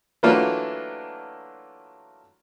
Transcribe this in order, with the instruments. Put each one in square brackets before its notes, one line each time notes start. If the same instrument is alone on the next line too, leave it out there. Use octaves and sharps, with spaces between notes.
[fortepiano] E3 F#3 A3 A#3 D4 F4